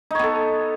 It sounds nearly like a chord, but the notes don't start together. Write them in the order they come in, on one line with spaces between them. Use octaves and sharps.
D#4 C#5 B3 A4